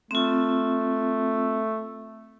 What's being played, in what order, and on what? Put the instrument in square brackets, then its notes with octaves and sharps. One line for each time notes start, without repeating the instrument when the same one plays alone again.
[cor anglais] A3 [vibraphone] C4 F4